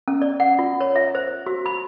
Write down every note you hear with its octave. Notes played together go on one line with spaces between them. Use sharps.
C#4
D5
F#5
F4
C#5
E5
C5
F#4
B5